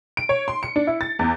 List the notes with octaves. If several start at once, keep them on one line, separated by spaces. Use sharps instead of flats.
D7
C#5
C6
C#7
D4
E4
A6
E2